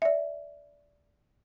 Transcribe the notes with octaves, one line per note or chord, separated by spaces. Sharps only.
D5 E5